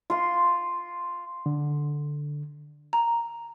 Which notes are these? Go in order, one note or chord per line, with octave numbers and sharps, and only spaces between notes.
F4 C6
D3
A#5